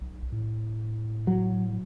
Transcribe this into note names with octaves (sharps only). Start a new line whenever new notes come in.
B1
A2
F#3